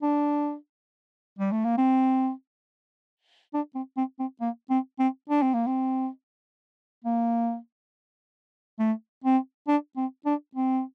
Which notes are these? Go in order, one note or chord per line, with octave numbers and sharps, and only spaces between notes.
D4
G3
A3
A#3
C4
D4
C4
C4
C4
A#3
C4
C4
D4
C4
A#3
C4
A#3
A3
C4
D4
C4
D4
C4